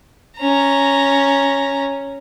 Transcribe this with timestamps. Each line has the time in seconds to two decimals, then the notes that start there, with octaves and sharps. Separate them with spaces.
0.38 C#4 A#5